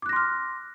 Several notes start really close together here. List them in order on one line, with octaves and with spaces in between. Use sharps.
D6 F#6 A#6 C6 F6